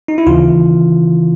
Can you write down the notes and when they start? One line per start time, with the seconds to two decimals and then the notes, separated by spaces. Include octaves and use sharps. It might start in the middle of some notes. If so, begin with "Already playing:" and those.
0.08 D#4
0.18 E4
0.27 D#2 C#3 E3 F4